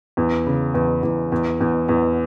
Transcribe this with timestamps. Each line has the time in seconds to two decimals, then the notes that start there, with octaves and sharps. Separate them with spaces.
0.17 E2
0.46 C#3
0.74 E2
1.03 E2
1.32 E2
1.61 E2
1.89 E2